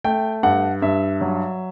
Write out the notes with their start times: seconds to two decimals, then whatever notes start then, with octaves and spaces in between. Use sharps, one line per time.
0.04 A3 G5
0.43 G2 F#5
0.82 G2 E5
1.21 F#3